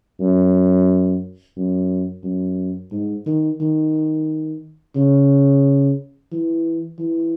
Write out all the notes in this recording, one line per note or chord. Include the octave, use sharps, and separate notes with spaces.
F#2
F#2
F#2
G#2
D#3
D#3
C#3
E3
E3